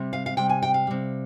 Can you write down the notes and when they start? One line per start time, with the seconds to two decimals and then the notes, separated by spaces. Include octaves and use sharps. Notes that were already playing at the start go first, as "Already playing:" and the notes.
Already playing: C3 G3
0.13 F5
0.26 F5
0.37 C3 G3 G5
0.49 G#5
0.63 G5
0.74 F5
0.87 C3 G3